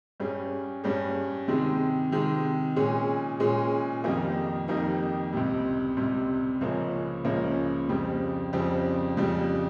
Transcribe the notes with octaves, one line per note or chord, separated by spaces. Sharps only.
G2 G3 C#4 G#4
G2 G3 C#4 G#4
C3 D#3 G#3
C3 D#3 G#3
A#2 G#3 C#4 G#4
A#2 G#3 C#4 G#4
F2 D#3 G3 A#3 D#4
F2 D#3 G3 A#3 D#4
C#2 C3 G3
C#2 C3 G3
C#2 C#3 F3 A#3 C#4
C#2 C#3 F3 A#3 C#4
F2 C#3 G3 C4
F2 C#3 G3 C4
F2 C#3 G3